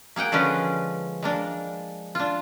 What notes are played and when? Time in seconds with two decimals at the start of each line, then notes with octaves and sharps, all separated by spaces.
0.16 A#3 G#4 F#5 G5
0.32 D3 F3 G#3 C#4 B4
1.23 G#3 A#3 D4
2.15 D4 F4